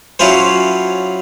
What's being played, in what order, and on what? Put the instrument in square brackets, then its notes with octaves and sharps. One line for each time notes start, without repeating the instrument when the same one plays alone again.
[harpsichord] F#3 C#4 E4 F4 G#4 C5